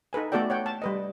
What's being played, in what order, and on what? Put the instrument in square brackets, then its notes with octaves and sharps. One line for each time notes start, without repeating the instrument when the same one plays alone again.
[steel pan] D#4 A4 B4 G#5
A3 B3 F#4 A4 D5 G5
C#5 F#5 G5
A5
G3 B4 D#5